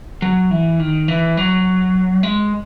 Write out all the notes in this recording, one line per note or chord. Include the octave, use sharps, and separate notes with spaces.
F#3
E3
D#3
E3
F#3
G#3